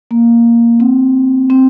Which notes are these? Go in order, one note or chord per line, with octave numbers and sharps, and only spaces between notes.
A#3
C4
C4